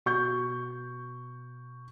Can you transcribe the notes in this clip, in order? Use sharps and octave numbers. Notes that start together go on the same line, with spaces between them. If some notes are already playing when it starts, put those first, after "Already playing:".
B2 C#6 G6